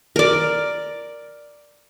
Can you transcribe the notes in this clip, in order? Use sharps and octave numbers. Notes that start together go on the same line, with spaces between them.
A#4 D5